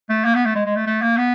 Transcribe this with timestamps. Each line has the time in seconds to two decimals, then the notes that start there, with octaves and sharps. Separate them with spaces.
0.09 A3
0.25 A#3
0.35 B3
0.45 A3
0.55 G#3
0.65 G#3
0.76 A3
0.87 A3
1.02 A#3
1.17 B3